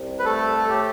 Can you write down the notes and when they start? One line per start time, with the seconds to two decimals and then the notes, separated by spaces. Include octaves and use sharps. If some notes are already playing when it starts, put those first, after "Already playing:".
Already playing: C2
0.19 B4
0.25 A3 A4
0.69 A2 G4